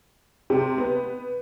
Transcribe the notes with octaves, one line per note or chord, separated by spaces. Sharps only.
C3
B3